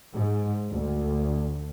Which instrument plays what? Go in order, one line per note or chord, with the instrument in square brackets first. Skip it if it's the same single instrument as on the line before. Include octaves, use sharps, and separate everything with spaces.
[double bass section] G#2
D2